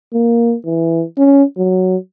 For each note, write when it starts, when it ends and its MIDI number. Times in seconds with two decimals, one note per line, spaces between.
0.14 0.55 58
0.65 1.04 52
1.18 1.43 61
1.58 1.96 54